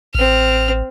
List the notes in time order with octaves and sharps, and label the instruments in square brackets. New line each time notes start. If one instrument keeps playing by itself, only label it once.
[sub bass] A1 [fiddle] C4 F6